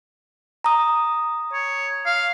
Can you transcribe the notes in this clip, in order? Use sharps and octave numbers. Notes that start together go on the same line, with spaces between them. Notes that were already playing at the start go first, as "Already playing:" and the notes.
A#5 D#6
C#5
F5